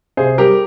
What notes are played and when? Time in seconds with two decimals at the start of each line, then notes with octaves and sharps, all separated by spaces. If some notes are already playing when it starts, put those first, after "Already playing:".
0.17 C3 G#4 C5
0.38 G3 G4 A#4